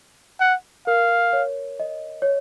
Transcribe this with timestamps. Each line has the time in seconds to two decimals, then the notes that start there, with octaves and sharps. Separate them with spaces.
0.41 F#5
0.87 A#4 F5
1.33 C#5
1.80 D#5
2.22 C#5